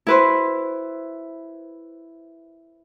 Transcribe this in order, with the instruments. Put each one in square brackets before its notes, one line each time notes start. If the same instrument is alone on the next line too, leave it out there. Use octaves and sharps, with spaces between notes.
[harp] E4 B4 C5